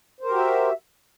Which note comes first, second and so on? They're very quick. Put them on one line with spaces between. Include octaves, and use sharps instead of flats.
C5 A#4 G4 F#4 E5